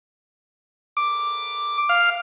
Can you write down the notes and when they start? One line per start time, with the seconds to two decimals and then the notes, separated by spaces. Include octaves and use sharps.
0.97 D6
1.89 F5